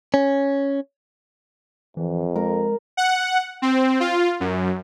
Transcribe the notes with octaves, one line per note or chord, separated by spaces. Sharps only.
C#4
F2 E3
G#3 A#4
F#5
C4
F4
F#2